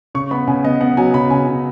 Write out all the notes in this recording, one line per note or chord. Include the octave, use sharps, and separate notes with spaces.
C#3 C#6
B3 B5
C#3 G#5
B3 D#5
B3 F#5
F#3 G#5
C#3 B5
C#3 G#5
C#3